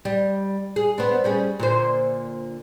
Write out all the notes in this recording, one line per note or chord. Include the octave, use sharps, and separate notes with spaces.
G3
G#4
B3 C4 D4
G3 C#4 G#4
A#2 D3 C5